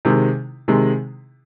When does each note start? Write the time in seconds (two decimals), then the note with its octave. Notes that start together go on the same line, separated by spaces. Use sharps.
0.05 C3 D#3 G#3
0.68 C3 D#3 G#3